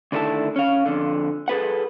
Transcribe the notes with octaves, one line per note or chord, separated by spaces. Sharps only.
D2 D#3 D4 E4 A4 A5
C#4 F5
F2 D3
G#4 A4 B4 F#5